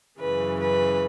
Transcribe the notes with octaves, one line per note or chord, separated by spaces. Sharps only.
F#2 C#3 E3 B4
B4